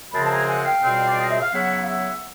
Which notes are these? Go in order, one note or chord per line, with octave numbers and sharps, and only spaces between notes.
F#2 C#3 F3 G#3 C4 A5 B5
A5
G#5 A#5
F#5 G#5
F5 G5
C#2 B2 G3 C4
D5
D#5
E5
F5
C#3 F#3 B3 E4 E5 F#5
F5
E5 F#5